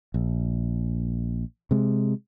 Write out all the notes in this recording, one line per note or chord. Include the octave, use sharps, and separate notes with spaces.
A#1
C3 G#3